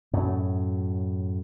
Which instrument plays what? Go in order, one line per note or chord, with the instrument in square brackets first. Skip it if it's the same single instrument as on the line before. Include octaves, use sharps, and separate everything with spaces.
[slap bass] F#2 A2 F#3